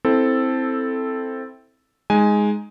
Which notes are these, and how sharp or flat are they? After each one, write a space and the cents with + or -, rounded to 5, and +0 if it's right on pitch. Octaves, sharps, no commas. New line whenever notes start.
C4 +0 E4 -10 A4 +0
G#3 +0 D#4 +0 G#5 +0